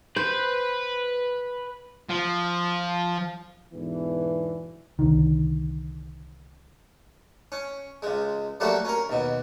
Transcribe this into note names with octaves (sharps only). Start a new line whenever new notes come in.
B4 C5
F3
E2 G#2 B2 D3 E3
C2 D3 D#3
C#4
C#2 G#3
F#3 G3 A3 A#3 F#4
C#4 A#4
D#2 B2